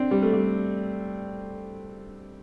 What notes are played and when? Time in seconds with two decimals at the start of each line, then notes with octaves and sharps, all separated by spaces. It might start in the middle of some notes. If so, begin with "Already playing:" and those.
Already playing: C4 D4
0.11 G3
0.23 A3
0.33 G3